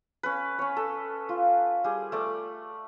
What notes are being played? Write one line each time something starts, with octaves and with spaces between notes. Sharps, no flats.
C#4 B4
C#4 C#5
A4
F4
G3 G#4
A3 D5